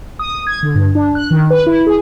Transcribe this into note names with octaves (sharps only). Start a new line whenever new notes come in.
D#6
G#6
D3
G2
D4
F#6
D#3
B4
E4
G#4